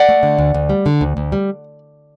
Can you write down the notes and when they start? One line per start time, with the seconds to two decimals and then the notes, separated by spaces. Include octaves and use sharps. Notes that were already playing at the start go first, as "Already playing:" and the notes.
Already playing: D5 F#5
0.09 A3
0.23 D3
0.39 D2
0.54 D2
0.69 G3
0.86 D3
1.01 D2
1.17 D2
1.32 G3